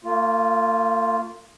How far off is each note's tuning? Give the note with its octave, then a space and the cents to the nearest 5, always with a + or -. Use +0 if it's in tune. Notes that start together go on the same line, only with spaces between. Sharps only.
A#3 -45 F4 +0